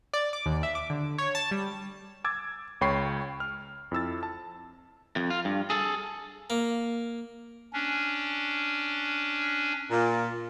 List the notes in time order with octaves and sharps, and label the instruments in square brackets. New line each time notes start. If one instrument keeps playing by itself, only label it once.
[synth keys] D5
D6
D#2
E5
D6
D3
C#5
A5
G3
[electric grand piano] D6 E6 G#6 A6
C#2 C#5 G5 B5 C#6 C7
F6
F2 E4 E6 A6
A5
[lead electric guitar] F2
F4
G2
G#4 A4
[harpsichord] A#3
[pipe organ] C#4 D4
[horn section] A#2